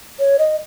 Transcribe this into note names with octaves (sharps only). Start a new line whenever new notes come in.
C#5
D#5